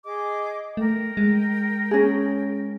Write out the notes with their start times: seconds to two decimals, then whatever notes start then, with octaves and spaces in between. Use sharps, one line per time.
0.04 G#4 D#5 D6
0.77 A3 A#4 G5
1.17 G#3
1.91 C#4 G#4